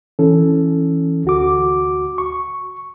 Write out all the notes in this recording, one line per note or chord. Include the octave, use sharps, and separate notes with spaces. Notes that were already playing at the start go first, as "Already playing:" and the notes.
E3 C#4 A4
D2 F#4 D6
C#6